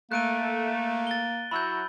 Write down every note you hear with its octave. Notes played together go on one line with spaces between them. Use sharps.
A3 A#3 F#6 D7 D#7
A6 G7
F#3 E4 F#4 B5 E6 G6